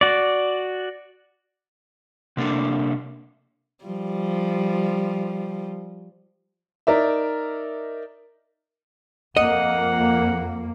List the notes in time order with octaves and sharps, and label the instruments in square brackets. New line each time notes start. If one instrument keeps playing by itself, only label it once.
[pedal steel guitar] F#4 D5
[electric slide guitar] C3 A#3 D4 A4
[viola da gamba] F3 G3
[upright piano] D#4 A#4 D5 E5
[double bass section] F2 A#3 [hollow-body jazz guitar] D#5 [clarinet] F#5